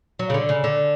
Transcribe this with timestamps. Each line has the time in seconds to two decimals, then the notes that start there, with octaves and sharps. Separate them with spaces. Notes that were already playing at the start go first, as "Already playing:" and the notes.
0.19 F#3
0.30 C#3
0.34 D3
0.49 C#3
0.64 D3